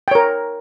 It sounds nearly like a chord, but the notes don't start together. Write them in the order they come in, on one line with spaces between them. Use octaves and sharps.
G5 C#5 A#4